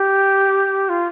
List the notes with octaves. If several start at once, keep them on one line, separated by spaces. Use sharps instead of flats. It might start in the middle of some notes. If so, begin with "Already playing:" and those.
Already playing: G4
F4